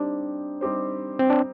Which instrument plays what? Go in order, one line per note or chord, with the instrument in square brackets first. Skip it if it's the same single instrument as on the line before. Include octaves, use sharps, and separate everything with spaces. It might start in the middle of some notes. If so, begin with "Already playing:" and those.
Already playing: [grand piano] G3 C4 D#4 G4 C5 [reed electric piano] D4
[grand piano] G3 C4 D#4 G4 C5
[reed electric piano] C4
D4